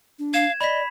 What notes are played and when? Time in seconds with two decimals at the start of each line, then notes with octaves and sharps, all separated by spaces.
0.19 D4
0.34 F5 G#6 E7
0.61 D5 D#5 B5 B6